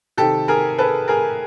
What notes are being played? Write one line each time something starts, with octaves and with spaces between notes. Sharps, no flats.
C3 D#3 G4 A4
G#4 A#4
A4 B4
G#4 A#4